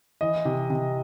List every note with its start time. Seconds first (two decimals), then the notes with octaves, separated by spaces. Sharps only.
0.21 E3 D#5
0.45 C3
0.70 C3